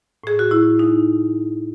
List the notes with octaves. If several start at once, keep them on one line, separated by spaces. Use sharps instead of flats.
A2 G#4
F#4
A2 E4
G#3 D#4